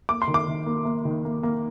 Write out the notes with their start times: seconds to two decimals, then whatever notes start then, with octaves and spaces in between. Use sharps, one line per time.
0.09 A#3 D6
0.22 C6
0.27 D#3
0.34 D6
0.48 D#3
0.66 A#3
0.85 A#3
1.05 D#3
1.25 A#3
1.43 A#3